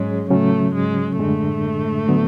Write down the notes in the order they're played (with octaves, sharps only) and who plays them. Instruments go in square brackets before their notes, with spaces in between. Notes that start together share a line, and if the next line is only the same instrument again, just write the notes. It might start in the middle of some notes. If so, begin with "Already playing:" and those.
Already playing: [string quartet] G#2 G#3 [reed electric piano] F#3 C#4 G#4 C#5
[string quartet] A2 A3 [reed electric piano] C#3 F#3 C#4
[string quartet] G#2 G#3
[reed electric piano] F#2 D3 G#3 D4 [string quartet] A2 A3
[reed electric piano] D3 F#3 B3